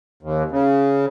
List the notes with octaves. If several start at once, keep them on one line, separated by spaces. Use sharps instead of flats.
D#2
C#3